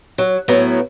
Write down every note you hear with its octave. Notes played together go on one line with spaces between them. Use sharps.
F#3
A2 F#3 B3